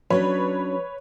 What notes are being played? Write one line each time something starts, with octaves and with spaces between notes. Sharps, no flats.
F#3 C#4 D4 B4 C#5 B5